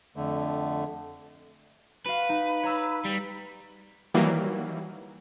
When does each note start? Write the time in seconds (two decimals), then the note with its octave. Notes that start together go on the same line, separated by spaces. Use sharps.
0.16 F2 D3 A3
2.06 F#4 B4 F5
2.29 D#4
2.63 C#5 A#5 E6
3.05 G3
4.14 D#3 E3 F#3 G3 A#3